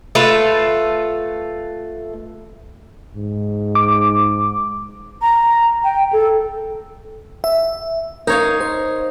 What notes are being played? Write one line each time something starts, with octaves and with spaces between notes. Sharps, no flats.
A3 F4 B4
G#2
D6
A#5
G5
A4
E5
D#4 A#4 C#5 F5
C5